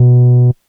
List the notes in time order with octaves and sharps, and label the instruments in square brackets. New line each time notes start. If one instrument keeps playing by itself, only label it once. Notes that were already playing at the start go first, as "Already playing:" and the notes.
Already playing: [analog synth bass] B2